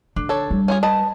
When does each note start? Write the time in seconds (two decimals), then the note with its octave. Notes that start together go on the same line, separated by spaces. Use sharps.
0.16 D3 D4
0.29 A4 C#5
0.51 G3
0.68 C#4 F4 G#4
0.83 B4 D#5 A5 B5